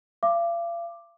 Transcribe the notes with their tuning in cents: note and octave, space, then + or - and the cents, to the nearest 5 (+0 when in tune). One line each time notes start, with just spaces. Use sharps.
F5 -40 D6 +5